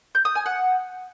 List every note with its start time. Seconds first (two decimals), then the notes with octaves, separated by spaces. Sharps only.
0.15 G6
0.25 D#6
0.35 G#5
0.46 F#5